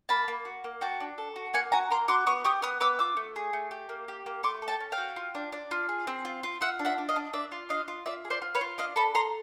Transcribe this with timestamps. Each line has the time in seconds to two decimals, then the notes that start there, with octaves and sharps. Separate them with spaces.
0.09 A#3 A5 B5
0.28 A#3
0.45 F#4
0.64 A#3
0.81 F#4 G5 A5
1.00 D4
1.18 A4
1.36 F#4
1.54 A#3 F#5 G#5
1.72 F#4 G#5 A#5
1.90 A#3 A#5 C6
2.08 F#4 C6 D6
2.27 B3 C#6 D#6
2.45 G4 C#6 D#6
2.62 B3 D#6 F6
2.80 B3 D6 E6
2.99 F4 D6 E6
3.17 A3
3.36 G#4
3.53 A3
3.71 G4
3.89 A#3
4.08 G4
4.26 A#3
4.43 A3 C6 D6
4.62 A4
4.68 G5 A5
4.80 C#4
4.92 F5 G5
4.98 F#4
5.16 F4
5.35 D4
5.52 D4
5.71 F4
5.89 G#4
6.07 C4
6.25 F4
6.43 F4
6.61 F4 E5 F#5
6.79 D4
6.85 E5 F#5
6.98 D4
7.09 D#5 F5
7.16 D4
7.33 D4 D5 E5
7.52 F4
7.69 D4 D#5 F5
7.88 F4
8.06 F4 D5 E5
8.25 G#4
8.30 C5 D5
8.42 F4
8.55 B4 C#5
8.61 F4
8.78 D4 D#5 F5
8.96 A4 A5 B5
9.14 A4 A#5 C6